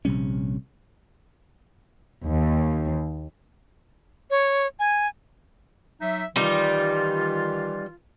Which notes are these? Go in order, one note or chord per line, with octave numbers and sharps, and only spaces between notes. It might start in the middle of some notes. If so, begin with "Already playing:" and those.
A#1 C3 G3 C#4
D#2
C#5
G#5
F#3 D#4 E5
D#3 E3 G3 D#4 F4